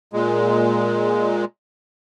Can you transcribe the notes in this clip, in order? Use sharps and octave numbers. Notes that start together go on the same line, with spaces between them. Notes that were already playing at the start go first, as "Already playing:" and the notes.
A#2 G#3